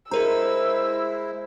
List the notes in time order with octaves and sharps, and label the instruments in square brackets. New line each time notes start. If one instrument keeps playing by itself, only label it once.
[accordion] G#3 E4 [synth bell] G#4 A#4 A#5 [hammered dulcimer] C5 [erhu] E6